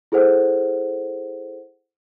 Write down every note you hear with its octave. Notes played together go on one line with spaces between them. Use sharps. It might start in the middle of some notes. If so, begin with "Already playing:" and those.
E4 G#4 A4 C5 F#5